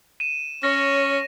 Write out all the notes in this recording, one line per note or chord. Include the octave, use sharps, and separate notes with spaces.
D#7 E7
C#4 C#5 A#6